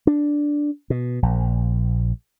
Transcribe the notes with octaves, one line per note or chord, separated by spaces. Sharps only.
D4
B2
A#1